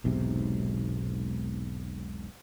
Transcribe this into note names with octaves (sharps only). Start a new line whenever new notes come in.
E1 B1 G#2 C3